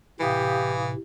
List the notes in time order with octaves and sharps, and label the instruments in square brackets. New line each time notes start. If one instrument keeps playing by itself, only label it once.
[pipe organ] A2 C3 [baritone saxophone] E3 [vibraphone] E4 F5 D#6 [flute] G4